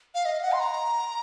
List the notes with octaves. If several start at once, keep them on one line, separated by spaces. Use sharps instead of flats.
F5
D#5
F#5
C6
A#5